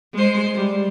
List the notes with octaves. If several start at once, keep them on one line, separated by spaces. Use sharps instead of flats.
G#3 C5
G3